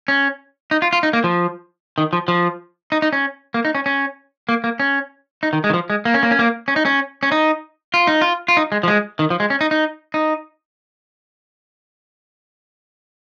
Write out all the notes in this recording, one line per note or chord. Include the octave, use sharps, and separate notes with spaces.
C#4
D#4
F4
F4
D#4
A#3
F3
D#3
F3
F3
D#4
D#4
C#4
A#3
D#4
C#4
C#4
A#3
A#3
C#4
D#4
D#3
G#3
D#3
F3
G#3
A#3
C#4
A#3
C#4
A#3
C#4
D#4
C#4
C#4
D#4
F4
D#4
F4
F4
D#4
G#3
F3
G#3
D#3
F3
G#3
C#4
D#4
D#4
D#4